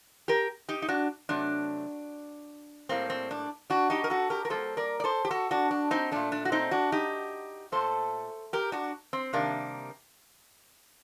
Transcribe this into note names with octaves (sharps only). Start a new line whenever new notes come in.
G4 A#4
D#4 G4
D#4
D4 F#4
C3 F#3 A3 D4
A2 G3 A#3 C4
C4
D4
D4 F#4
D#4 G4
A#4
F#4 A4
G4 A#4
A#4
A2 G3 A#3 A4 C5
A#4 D5
D5
A4 C5
G4
F#4 A4
D4 F#4
D4
C4 D#4
A#2 A3 D4
D4
F#4
C4 D#4
D4 F#4
D#4 G4
A#2 A3 A4 C5
G4 A#4
D4 F#4
C4
C3 D#3 G3 A#3 D4